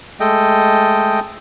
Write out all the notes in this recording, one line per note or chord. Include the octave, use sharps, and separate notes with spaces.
G#3 A3 A4 D#5 G5